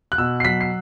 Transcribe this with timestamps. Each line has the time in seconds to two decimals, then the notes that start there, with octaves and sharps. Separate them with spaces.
0.12 F#6
0.18 B2 E6
0.40 C7
0.45 F#3 B6
0.61 C7